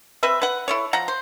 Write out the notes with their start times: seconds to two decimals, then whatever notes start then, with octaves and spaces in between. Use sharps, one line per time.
0.23 C4 B4 E5
0.42 B4 F#5
0.68 E4 A4 C#5
0.93 F3 F#5 A#5
1.08 C5